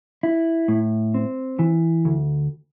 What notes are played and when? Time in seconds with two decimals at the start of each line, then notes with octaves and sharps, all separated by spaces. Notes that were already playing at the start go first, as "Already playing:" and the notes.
0.23 E4
0.68 A2
1.14 C4
1.59 E3
2.05 D2